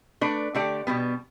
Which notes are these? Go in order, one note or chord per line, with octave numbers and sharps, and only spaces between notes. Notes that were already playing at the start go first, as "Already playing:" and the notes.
A3 D4 B4 D5
D3 A3 G4 D5
B2 G3 B3